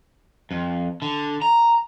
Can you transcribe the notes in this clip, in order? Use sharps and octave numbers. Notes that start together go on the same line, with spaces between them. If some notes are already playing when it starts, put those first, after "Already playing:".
F2
D3
A#5